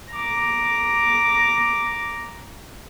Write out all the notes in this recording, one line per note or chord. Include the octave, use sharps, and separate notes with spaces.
A#5 D6